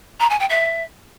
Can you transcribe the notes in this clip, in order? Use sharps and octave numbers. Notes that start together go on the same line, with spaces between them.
A#5
G#5
G5
E5